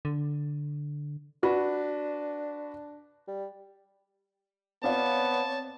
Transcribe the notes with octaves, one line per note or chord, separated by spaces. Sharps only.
D3
D4 F#4 B4
G3
B3 C4 C#5 D5 F5 A5